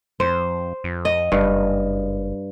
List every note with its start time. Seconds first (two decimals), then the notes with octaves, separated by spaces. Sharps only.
0.20 F2 C5
0.84 F2
1.05 D#5
1.32 F#1 G2